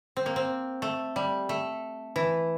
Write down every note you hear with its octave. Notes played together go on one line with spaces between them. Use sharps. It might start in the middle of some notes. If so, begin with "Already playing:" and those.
C4
A#3
C4
A3
G3
A3
E3